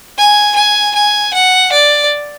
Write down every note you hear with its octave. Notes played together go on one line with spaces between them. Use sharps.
G#5
G#5
G#5
F#5
D5